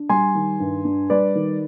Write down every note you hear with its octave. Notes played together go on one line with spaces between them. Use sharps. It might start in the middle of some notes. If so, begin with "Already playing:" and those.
Already playing: D4
G3 G#5 C6
D#3
G2
D4
G3 B4 D5
D#3